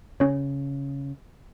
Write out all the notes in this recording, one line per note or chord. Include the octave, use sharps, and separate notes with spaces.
C#3 C#4 C#5